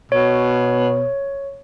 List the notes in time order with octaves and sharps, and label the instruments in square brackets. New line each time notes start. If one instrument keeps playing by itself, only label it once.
[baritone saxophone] B2 [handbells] C#5